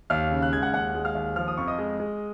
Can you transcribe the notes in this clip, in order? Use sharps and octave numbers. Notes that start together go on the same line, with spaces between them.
D#2 F5 F6
C#3
F#6
G#3 G#6
F#5 F#6
D#2 F#5 F#6
G#3
F5 F6
D#2
F3 F6
D#6
F2 C#6
D#5 D#6
G#3
G#3